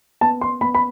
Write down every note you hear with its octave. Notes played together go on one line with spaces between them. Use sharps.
B3 A5
C6
B3 B5
B5